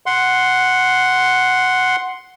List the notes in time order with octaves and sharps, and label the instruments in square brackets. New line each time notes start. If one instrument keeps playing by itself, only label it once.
[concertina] F#5 C6